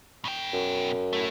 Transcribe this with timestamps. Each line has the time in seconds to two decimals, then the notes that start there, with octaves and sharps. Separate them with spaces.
0.25 B2 G5
0.53 F#2
1.13 A3 E4